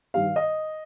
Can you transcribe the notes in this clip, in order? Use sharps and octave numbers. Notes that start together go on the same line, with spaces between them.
G2 D#3 G3 F5
D#5